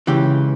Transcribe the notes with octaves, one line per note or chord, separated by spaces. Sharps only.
C#2 C#3 E3 G4